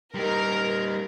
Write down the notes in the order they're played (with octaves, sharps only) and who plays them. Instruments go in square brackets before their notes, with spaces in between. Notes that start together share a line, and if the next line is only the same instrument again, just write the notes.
[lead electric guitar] G3 D#4 [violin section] A#4